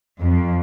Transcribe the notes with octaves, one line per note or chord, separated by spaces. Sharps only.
F2